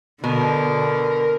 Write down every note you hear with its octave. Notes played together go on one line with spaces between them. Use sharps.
B2 D3 A#4